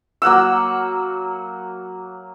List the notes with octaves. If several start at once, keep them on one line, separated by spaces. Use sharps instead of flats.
F#3 A#3 F#5 E6